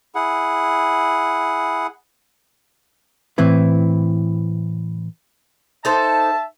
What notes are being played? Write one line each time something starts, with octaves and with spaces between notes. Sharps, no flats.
E4 G#4 F#5
A2 E3 C4 E4 B4
D#4 A4 C5 E5 A5